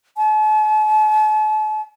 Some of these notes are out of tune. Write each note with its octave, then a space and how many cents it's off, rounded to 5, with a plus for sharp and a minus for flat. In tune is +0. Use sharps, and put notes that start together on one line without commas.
A5 -45